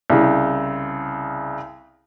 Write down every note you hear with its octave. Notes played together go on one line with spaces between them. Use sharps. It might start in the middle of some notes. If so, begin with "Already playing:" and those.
C2 C#3